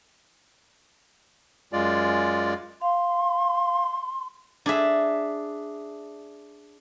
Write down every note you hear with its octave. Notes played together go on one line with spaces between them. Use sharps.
F#2 G#3 F4 D5
F5 C6
D4 G#4 E5